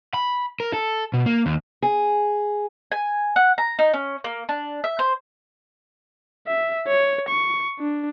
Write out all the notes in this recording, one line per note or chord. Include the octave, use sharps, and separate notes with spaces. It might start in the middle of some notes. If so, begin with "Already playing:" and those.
B5
A#4
A4
B2
A#3
D#2
G#4
G#5
F#5
A#5
D#4
C#4
A#3
D4
E5
C5
E5
C#5
C#6
D4